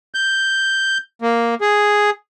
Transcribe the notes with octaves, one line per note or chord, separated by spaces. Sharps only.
G6
A#3
G#4